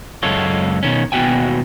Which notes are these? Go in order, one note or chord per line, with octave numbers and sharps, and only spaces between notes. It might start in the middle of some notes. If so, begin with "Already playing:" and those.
C#2 F#2 G#3 F4 A4 C#5
B2 D#3 C#4
D#2 B2 B3 F#4 G5 G#5